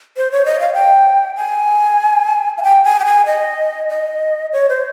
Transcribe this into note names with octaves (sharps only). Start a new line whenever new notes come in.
C5
C#5
D#5
F5
G5
G#5
F5
G5
G#5
G5
G#5
D#5
D#5
C#5
C5